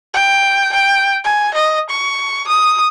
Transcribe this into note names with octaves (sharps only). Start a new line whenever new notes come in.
G5
G5
G#5
D#5
C#6
D#6